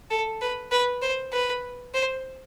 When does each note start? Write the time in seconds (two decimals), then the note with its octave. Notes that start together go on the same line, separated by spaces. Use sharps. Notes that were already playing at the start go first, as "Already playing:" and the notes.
0.10 A4
0.41 B4
0.71 B4
1.02 C5
1.32 B4
1.94 C5